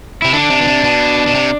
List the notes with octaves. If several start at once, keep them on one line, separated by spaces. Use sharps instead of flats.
C3 E4
D3 D4
C3
B2
C3
B2
B2
C3